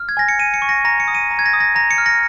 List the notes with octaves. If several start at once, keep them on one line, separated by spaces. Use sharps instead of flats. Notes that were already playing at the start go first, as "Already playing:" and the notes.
Already playing: F6
G#6
G#5 A#6
C#7
G#5 D#7
C#7
C#6
A#6
A#5 A#6
C#7
D#6
D#7
A#5
G#6
A#6
D#6
A#6
A#5 A#6
C#7
F6
A#6